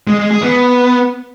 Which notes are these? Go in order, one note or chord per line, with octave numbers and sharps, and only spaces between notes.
G#3
G#3
G#4
B3